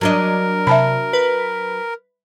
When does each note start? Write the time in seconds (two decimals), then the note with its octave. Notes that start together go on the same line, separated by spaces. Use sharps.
0.01 F#3 D4 A#4 D#5
0.67 C3 E5 A5 B5
1.13 B4